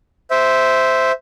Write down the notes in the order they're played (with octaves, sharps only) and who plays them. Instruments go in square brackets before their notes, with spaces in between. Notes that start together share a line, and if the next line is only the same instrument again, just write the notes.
[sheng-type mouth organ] C5 E5